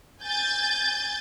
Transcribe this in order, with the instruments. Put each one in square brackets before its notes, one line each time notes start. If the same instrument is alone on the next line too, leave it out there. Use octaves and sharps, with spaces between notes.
[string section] G#5 G6 A6